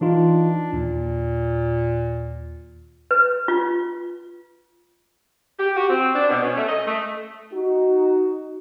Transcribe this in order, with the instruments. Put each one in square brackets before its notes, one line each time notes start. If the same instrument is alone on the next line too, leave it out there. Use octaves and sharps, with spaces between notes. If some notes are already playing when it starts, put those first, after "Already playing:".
[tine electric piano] E3 D#4 F4 [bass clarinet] D4
[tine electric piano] D#2 [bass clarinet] A#2
[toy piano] B4
F4
[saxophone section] G4
F#4
C4
D4
B2
C#4
A3
D#5
A3
[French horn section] D#4 F#4